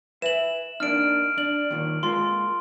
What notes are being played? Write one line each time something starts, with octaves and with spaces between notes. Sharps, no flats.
B4 E5 E7 F#7
A#3 D4 D#4 F6 D7
D4 F#7
D#2 A#2 D#3
G#3 A#3 F4 C6